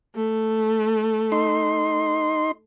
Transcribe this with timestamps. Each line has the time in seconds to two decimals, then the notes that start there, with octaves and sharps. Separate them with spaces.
0.16 A3
1.32 D#4 C6